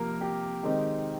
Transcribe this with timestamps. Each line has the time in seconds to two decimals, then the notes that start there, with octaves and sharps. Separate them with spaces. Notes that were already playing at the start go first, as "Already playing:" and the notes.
Already playing: C3 F3 A#3 A#4
0.21 G4
0.63 D#3 G#3 C4 D#4